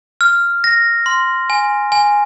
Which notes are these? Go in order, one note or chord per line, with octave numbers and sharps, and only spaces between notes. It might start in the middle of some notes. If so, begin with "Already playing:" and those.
F6
A#6
C6
G#5
G#5